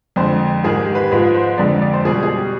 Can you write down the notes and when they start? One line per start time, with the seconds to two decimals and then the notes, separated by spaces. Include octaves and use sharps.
0.16 F2 D3 G#3 C5
0.64 G#2 D#3 G#3 G#4
0.80 G4
0.95 B4
1.11 G#2 F3 G#3 B4
1.34 C5
1.58 F2 D3 G#3 D5
1.82 D5
1.94 C5
2.05 B2 G3 G#4
2.14 G4
2.23 G#4